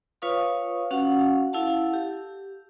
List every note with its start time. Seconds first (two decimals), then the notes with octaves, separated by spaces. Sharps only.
0.22 F4 B4 C#5 F5 C#6 D#6
0.91 C#4 F#4 F5 F#5
1.53 E4 A4 F5 F#5 A5
1.94 G4